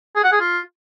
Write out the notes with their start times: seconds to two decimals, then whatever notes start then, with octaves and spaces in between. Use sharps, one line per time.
0.16 G#4
0.24 F#5
0.32 G#4
0.40 F4